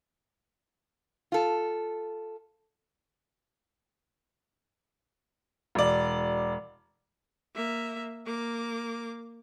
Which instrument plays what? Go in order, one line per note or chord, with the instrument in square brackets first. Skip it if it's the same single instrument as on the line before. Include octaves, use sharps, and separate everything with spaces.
[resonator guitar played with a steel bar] F4 A4
[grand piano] E1 D5
[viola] A#3 E5
A#3 D6